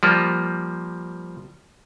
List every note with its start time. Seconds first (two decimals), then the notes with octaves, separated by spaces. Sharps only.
0.03 F3 G3 A#3